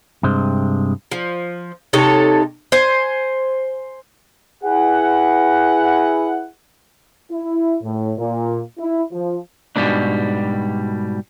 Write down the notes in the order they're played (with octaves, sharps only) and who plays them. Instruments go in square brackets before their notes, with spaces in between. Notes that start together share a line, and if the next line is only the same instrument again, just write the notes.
[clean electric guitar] G2 C3 G#3 C5
[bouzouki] F3
C3 D#4 A4 C#5
C5 G#5
[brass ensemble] E4 G#4 B4 F#5
[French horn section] E4
A2
A#2
E4
F3
[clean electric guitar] G#2 B2 G3 G#3 A#3 D4